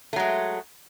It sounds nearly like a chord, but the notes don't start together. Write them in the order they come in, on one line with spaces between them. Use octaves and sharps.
A3 F#3 G#3